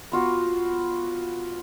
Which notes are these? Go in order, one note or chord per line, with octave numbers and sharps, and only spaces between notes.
B3 F4 F#4